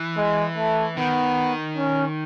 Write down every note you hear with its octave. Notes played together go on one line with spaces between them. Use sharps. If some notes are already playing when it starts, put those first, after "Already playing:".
Already playing: E3
G#3
A3
D#3 B3
C#4